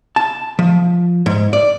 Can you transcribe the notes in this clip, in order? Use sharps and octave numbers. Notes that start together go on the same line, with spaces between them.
A5
F3
G#2
D5